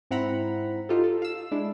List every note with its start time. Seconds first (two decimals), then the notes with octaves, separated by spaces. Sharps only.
0.11 G#2 C4 E4 F#5 A#5 B5
0.89 D#4 F4 G4 A4
1.04 A4
1.22 F5 E6
1.51 G#3 D4 E4